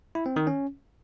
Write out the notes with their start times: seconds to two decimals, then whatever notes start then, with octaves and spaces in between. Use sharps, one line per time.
0.15 E4
0.26 C4
0.36 D#3
0.47 C#4